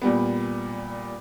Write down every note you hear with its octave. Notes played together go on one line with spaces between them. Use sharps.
A#2 G3 B3